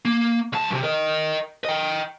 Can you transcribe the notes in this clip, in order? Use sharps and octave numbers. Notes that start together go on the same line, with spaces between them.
A#3
C#2 A5
G2 C3
A#4 D#5
D#5 G5